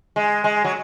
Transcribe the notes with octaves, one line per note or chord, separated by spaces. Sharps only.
G#3
G#3
F#3